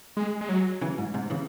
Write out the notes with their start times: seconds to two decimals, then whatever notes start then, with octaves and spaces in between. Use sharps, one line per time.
0.17 G#3
0.41 G#3
0.49 F#3
0.81 C#3 E3
0.98 G#2
1.14 G#2 C3
1.30 C#3 E3